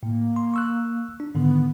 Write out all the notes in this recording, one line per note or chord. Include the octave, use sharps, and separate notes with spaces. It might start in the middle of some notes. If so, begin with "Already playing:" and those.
A2 A#3
C6
C#6 E6 F#6
D4
G#2 D3 D#3 B3